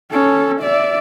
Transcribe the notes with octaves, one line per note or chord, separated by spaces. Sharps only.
C#4 A4
D5 E5